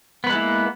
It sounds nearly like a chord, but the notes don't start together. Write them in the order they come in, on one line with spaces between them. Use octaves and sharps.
B3 B4 G#3 E4 A#3